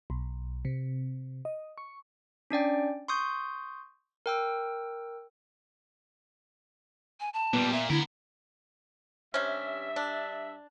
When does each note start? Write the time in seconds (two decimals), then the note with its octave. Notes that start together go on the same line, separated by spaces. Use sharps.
0.10 B1
0.65 C3
1.45 D#5
1.78 C#6
2.50 C#4 D4 D5 G5
3.08 C6 C#6 D#6 G6
4.26 A#4 G5 E6
7.20 G#5
7.34 A5
7.53 A#2 G3 B3
7.72 A#2 E5
7.90 D3 B3 E4 A#4
9.34 G2 C3 C#4 E5
9.96 D4